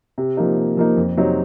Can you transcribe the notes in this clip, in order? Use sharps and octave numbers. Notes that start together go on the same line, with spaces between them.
C3
F3 A#3 D#4
C3
F3 A#3 D#4
F2
C3 F#3 C4 D#4